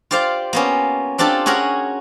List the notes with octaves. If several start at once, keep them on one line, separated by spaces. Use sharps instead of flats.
F4 G4 C5 D5 F5
A#3 B3 C#4
C4 D4 F4 G4 A4
C#4 F#4 G#4 A#4 F#5